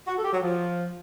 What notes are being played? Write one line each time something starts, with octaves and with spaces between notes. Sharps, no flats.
F#4
A4
G4
F#3
F3